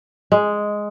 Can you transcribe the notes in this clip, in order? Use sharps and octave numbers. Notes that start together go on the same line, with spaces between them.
G#3